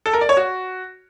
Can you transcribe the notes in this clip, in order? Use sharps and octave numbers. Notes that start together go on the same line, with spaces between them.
A4
A#4
D5
C#5
F#4